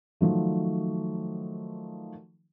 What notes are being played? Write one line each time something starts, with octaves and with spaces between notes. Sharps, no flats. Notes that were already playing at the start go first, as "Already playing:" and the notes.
D#3 F3 F#3 A3